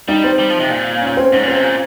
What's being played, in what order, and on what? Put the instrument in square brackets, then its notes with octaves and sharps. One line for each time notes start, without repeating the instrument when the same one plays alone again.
[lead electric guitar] G3 [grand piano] D#4
[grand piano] C4
[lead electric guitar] G3
F3
C3
A#2
[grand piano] C#4
C4
[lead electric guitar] G#2 [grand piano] C#4
[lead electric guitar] A#2 [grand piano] C4
[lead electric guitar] C3
A#2